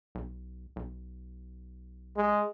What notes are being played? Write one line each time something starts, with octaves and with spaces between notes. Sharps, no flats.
B1
B1
G#3